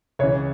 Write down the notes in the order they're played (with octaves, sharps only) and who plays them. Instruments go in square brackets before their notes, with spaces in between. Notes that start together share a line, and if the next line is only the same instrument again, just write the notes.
[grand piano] C#2 C#3 E3 [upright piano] C#5